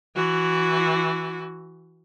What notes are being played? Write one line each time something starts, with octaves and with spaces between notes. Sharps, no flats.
E3 F#4